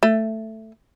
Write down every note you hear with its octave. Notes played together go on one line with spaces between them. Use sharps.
A3